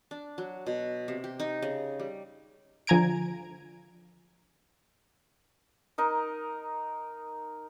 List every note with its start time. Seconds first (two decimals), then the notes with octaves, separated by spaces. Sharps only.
0.11 D4
0.38 F#3
0.67 B2
1.08 C3
1.24 G4
1.40 D#4
1.62 C#3
1.99 G3
2.87 D3 F3 G#5 A#5 G#6 D7
5.98 D#4 A#4 D#5